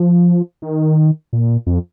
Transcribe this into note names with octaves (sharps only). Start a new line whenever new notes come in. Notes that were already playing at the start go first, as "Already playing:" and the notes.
Already playing: F3
D#3
A#2
F2